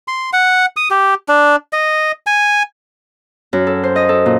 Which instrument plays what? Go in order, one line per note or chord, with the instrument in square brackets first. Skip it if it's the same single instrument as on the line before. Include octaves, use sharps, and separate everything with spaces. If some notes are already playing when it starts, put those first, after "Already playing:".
[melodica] C6
F#5
D#6
G4
D4
D#5
G#5
[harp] F#2
A4
C5
D#5
A4
A#2